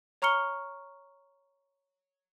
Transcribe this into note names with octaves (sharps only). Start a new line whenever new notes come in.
C#5 A#5 C#6 F6 C#7 G7